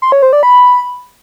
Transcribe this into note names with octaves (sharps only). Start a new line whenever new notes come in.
C6
C#5
C5
D5
B5